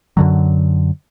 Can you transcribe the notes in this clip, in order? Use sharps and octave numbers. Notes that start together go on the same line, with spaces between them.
F#2 D3 F#3